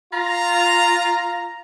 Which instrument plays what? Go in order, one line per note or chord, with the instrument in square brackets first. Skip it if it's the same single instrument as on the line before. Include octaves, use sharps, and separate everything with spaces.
[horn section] F4 A#5